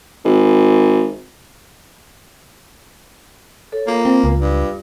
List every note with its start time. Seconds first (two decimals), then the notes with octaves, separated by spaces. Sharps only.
0.25 G#1
3.72 A4 C#5
3.87 A#3 F4
4.05 C4
4.24 C#2
4.40 G2